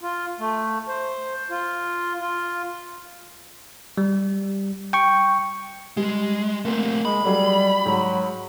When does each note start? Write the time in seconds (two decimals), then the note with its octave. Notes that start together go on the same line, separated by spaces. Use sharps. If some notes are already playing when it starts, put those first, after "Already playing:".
0.02 F4
0.39 A3
0.88 C5
1.51 F4
2.21 F4
3.98 G3
4.93 G5 C#6
5.97 G3 G#3
6.65 A3 A#3 C4
7.05 G#3 B5
7.25 F#3 G3 G#4
7.85 G#2 F#3